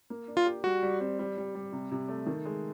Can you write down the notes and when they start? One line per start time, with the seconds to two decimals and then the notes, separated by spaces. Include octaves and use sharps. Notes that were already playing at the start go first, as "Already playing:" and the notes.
0.10 A#3
0.28 D4
0.37 F4
0.46 G4
0.64 G3 F#4
0.83 G3
1.00 C4
1.19 G3
1.37 G3
1.55 G3
1.73 C3
1.92 C3
2.08 A3
2.27 D#3
2.45 G#3